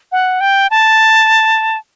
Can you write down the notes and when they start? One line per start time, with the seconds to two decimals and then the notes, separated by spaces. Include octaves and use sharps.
0.12 F#5
0.41 G5
0.71 A5